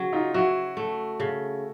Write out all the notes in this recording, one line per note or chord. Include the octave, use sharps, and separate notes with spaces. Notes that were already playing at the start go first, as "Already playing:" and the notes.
Already playing: C#3 F#3
D#4 F4
F#3 E4 F#4
A3
C#3